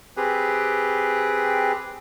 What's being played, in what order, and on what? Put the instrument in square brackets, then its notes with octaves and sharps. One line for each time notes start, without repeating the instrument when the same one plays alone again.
[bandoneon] C4 G4 G#4 B4